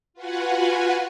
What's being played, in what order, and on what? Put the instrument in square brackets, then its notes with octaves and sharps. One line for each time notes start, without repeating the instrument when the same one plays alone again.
[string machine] F4 F#4 B4 F#5 G#5